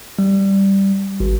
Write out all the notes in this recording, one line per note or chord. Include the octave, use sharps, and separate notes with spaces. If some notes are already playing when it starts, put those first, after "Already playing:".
G3
G#1